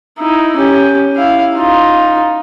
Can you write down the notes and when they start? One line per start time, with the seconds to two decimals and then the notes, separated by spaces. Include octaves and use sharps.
0.19 D#4 E4
0.56 C#4 G4
1.16 E4 F5
1.57 D#4 F4